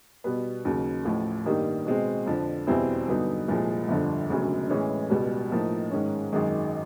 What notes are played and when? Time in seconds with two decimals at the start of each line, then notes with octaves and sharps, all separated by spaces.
0.24 B2 G3 B3
0.65 D#2 C#3 F#3
1.05 A1 A2 F3
1.45 G2 D#3 G3 A#3
1.86 B2 G#3 C4
2.26 F2 D3 F3
2.67 E2 B2 G3 C4 E4
3.08 G2 D3 F#3 B3 D#4
3.48 C2 A#2 F3 G#3
3.88 G1 F2 D3 F3
4.29 E1 D2 C#3 F#3
4.70 A2 E3 G#3 C#4
5.10 C#2 B2 G3
5.51 A2 F3 A#3 D#4
5.91 G#2 D#3 G#3 C#4
6.32 G#1 F#2 D#3 G#3